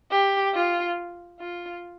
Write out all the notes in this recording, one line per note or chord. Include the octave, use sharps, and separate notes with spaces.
G4
F4
F4